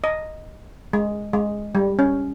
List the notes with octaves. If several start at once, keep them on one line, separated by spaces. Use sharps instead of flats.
D#5
G#3
G#3
G3
C#4